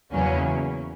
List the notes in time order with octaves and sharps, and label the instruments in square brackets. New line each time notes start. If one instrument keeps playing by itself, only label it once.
[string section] E2 C#3 F#3 A#3 C#4